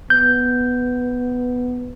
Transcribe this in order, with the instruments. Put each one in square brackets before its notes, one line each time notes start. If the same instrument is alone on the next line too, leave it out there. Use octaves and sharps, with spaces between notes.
[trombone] B3 [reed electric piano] G6